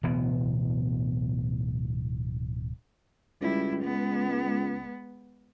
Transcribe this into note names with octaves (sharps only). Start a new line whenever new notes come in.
D1 B2 E3 B3
C#2 G3 E4
G#3 B3